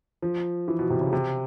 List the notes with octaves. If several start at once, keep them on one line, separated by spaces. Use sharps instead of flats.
F3
E3
B2
C3
C#3
C3